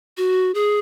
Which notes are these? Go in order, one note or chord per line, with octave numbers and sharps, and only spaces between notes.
F#4
G#4